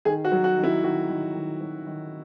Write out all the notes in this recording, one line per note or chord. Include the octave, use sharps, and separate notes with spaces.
D#3 G#4
F#4
F#3
F#4
D#3
E4
D#3 F#4
D#3
D#3
F#3
D#3